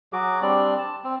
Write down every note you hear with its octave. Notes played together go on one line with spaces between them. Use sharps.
F#3 F#4 G#4 D6
G3 C4 D4 D5
A5
C4